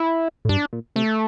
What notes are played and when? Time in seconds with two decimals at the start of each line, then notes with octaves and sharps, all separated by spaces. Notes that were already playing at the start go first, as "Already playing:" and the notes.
Already playing: E4
0.45 A2
0.49 G2 D4
0.73 A#2
0.95 C3 A3